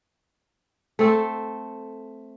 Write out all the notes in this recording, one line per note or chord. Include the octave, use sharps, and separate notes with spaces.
A3 C4 A4